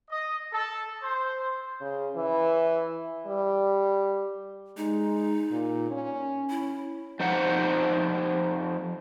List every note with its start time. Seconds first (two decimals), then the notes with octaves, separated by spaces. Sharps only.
0.10 D#5
0.52 A4
1.01 C5
1.81 C#3
2.16 E3
3.27 G3
4.77 G#3 D#4
5.51 A#2
5.91 C#4
6.50 E4
7.20 F2 F3 D#4 C5 F#5